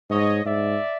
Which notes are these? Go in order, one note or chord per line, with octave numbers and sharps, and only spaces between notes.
G#2 C#5 D#5
G#2 D5 E5